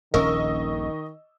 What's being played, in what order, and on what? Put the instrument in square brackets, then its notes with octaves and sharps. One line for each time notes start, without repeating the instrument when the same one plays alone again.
[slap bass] D#1 A#1 C#4 [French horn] D#3 [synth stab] A#4 [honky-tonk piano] D#5 C#6 E6